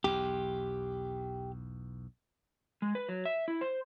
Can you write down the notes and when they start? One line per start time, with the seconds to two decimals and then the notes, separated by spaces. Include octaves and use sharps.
0.04 B1 E2 G4
2.82 G#3
2.95 B4
3.09 F#3
3.25 E5
3.48 E4
3.61 C5